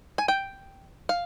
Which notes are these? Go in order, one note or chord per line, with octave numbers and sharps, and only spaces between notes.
G#5
G5
F5